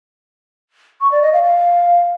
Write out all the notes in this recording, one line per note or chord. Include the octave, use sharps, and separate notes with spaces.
C#6
D5
D#5
F5
F5